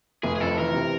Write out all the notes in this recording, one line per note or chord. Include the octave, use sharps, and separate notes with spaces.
F1 G#4
G#4
F2 A4
E3 A#4
C3